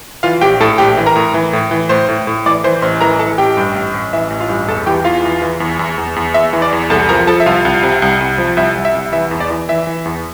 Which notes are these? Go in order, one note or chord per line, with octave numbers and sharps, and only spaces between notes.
E3 F4 F5
A#1 G4 G5
A2 A4 A5
A#1 G4 G5
E3
A#4 A#5
A2
E3
A2
E3
A2 C5 C6
A2
A2
E3 D5 D6
E3 C5 C6
A1 C5 C6
E3 A#4 A#5
E3 A4 A5
A1 G4 G5
G2
A1
A1
E3 E5
A1
F4 F5
G2
E2 A4 A5
E3 G4 G5
E2 F4 F5
E3
E3
E2
E2
E2
E2
E2 E5
E3
D5
E2
C2 A4 A5
F3 A#4 A#5
F3 A4 A5
E5
C2 F4 F5
C2
C3
C2
C2
F3
C2 E5
C2
E5
C2
E3 E5
E2
D5
E3
E3 E5
E3
E2